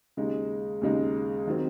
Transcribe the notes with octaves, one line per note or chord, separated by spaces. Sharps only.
D#2 C#3 G#3 D#4
D#2 C#3 G#3 D#4
D#3 F#3 C4